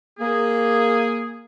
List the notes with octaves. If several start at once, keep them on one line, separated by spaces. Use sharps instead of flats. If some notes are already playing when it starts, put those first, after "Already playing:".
A#3 G#4